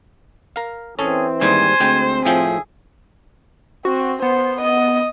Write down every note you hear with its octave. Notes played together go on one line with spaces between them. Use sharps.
A#4 F5
E3 C4 C#4 G#4 A4
D#2 G#2 G3 C5 G#5
D2 G#3 C4 G5
A2 F3 G#4 E5 G5
C4 F#4
B3 C5
D#5